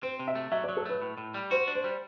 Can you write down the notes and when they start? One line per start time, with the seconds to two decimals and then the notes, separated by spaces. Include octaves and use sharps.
0.03 C4 C5
0.19 C3
0.28 E5
0.35 A3
0.52 F#3 E5
0.64 D5
0.69 F#3
0.77 A4
0.85 A3 B4
1.02 A2
1.18 A2
1.34 G3
1.51 F#4 C5
1.67 D4
1.75 C5
1.84 G3